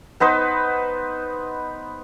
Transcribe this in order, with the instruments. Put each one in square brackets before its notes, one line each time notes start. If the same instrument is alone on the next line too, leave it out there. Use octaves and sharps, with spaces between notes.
[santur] B3 D#4 B4 C5